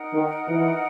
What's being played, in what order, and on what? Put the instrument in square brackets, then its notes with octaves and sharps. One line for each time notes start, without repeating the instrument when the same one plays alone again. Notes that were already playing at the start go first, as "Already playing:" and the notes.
Already playing: [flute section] D#4 A#4 D#5 F#5
[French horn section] D#3
E3